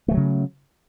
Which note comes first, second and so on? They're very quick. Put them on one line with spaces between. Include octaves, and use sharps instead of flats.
A3 E3 F#3 C#3